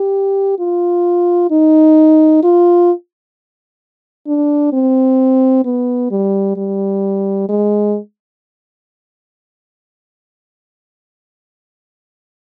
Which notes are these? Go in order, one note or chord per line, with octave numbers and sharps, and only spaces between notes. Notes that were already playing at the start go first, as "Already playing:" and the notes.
Already playing: G4
F4
D#4
F4
D4
C4
B3
G3
G3
G#3